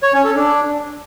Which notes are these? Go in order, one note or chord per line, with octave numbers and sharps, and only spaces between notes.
C#5
C#4
A4
D4